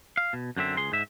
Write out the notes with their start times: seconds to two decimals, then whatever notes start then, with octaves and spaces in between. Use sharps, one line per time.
0.17 F5
0.33 B2
0.57 F#2 D3 C4 E5
0.77 C#2 G#4 C6
0.92 G#2 E5